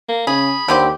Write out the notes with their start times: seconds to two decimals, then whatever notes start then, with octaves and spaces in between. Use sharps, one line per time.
0.09 A#3
0.27 C#3 G#4 B5
0.68 D#2 D3 C4 G4